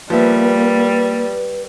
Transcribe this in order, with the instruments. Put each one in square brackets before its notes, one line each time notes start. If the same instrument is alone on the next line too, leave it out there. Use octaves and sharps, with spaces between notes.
[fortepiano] F3 B3 E5 [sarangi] G3 [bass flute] A#3 [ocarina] B4